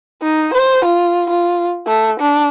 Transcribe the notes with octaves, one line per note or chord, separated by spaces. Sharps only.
D#4
C5
F4
F4
A3
D4